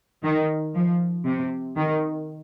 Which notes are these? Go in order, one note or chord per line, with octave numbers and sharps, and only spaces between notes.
D#3
F3
C3
D#3